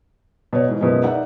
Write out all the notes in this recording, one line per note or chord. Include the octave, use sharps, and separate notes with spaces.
B2 C#5
G#2 E3
F#2 B2 F3 G#3
D#4 D5 E5 F#5